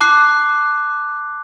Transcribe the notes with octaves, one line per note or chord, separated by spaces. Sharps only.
A5 D6 F#6 C7